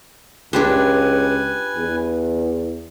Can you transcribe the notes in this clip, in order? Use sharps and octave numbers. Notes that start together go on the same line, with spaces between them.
C#2 D4 G4 B4 C5 G#5
E2